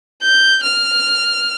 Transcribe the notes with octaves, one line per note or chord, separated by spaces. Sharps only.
G6
F6